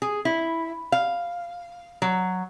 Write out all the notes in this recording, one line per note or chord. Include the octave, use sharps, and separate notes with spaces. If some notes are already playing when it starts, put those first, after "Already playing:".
G#4
E4
F5
F#3